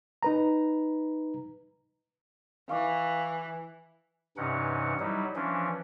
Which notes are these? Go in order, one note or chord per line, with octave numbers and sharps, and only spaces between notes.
D#4 B4 A#5
E3 F5 C#6 D6
G2 C3 E3 C#4 D#4 F#5
F#3 G3 D#4 E4
E3 F3 C#4 D4